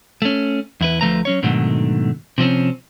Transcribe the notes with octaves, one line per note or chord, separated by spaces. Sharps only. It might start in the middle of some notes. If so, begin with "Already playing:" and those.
A3 C#4
E2 E4 B4
D2 F3 A3 B4 A#5
F#3 C#4 C#5
G#2 B2 D3 D#3 F#3 A3
C3 F3 C4 C#4